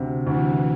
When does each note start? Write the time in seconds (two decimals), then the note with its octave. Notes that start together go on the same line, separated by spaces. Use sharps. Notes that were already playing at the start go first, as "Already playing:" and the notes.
Already playing: D2 C3
0.26 D2 E3